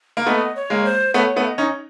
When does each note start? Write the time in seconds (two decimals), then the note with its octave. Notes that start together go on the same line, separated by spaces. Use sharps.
0.17 A#3
0.26 A3 B3 D#5
0.56 C#5
0.70 G#3 A#3
0.85 C5
1.14 A3 B3 C#5
1.36 A3 B3
1.44 F5
1.48 D#5
1.58 C#4 D#4